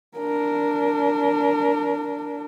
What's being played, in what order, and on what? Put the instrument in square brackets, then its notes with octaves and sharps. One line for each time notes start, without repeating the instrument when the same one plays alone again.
[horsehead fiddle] D4 A#4